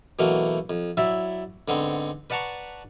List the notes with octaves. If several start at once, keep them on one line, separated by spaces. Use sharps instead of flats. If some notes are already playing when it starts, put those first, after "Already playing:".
B2 E3 F#3 A3 A#3
F2
F#3 E4 D5 E5
G#2 D3 B3 C4
B4 D5 F#5 A5 A#5 C#6